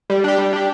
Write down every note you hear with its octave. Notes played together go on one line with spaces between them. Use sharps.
G3
D4 G4
G3
D4 G4